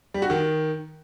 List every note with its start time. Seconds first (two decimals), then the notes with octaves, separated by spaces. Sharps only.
0.14 G3
0.22 F#4
0.30 D#3